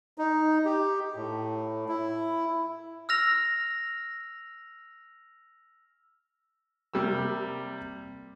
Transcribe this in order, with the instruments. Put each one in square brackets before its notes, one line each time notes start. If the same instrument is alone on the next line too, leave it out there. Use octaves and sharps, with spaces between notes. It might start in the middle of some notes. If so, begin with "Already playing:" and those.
[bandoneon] D#4
G4
A2
E4
[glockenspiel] E6 F6 A#6 F7
[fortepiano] C3 G3 A#3 E6